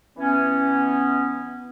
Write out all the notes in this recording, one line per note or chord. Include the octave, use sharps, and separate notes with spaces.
E3 B3 C#4